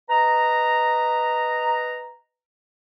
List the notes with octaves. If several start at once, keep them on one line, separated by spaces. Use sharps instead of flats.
B4 D#5 A#5